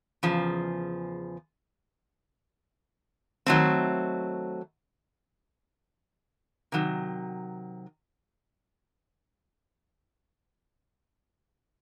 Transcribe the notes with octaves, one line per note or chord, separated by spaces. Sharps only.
E2 C#3 F3
D#3 F#3 A3 C4
C3 D#3 F#3